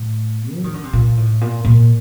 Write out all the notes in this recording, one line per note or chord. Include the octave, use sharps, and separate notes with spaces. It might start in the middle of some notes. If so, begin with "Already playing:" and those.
Already playing: A2
F#3
D#3
D3
C3
A#2
A2
A#2
A#2